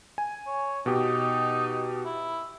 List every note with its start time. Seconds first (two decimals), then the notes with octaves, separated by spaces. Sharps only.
0.18 G#5
0.47 C#5
0.86 B2 D#4 G4
2.05 E4